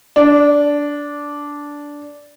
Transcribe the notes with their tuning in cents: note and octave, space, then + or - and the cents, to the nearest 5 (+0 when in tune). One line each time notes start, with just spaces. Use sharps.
D4 -10